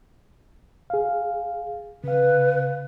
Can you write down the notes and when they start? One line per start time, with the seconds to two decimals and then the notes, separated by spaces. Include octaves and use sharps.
0.90 G#4 F5
2.04 C#3 B4 F5